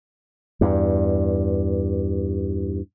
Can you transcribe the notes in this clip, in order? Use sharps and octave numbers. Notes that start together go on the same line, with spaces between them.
E2 G2